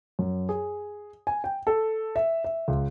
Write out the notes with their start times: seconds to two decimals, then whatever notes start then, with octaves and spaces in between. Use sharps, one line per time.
0.19 F#2
0.49 G#4
1.27 G#5
1.44 G5
1.67 A4
2.16 E5
2.44 E5
2.68 C#2